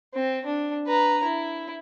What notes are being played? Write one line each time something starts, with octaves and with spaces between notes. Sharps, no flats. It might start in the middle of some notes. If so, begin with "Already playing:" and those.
C4
D4
B4 A#5
E4